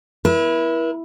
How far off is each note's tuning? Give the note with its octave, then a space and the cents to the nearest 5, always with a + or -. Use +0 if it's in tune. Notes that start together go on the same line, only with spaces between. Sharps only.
E4 +0 B4 -45